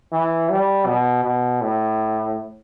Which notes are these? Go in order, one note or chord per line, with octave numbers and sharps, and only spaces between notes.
E3
G3
B2
B2
A2